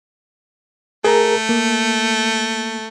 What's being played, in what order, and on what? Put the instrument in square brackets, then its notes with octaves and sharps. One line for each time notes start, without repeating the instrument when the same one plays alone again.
[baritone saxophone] A3 [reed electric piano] G#4 A#4 A#5
[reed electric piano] A#3